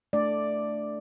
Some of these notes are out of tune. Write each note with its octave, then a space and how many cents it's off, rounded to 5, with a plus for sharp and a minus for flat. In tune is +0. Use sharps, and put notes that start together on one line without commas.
A3 +0 D4 +0 D5 +5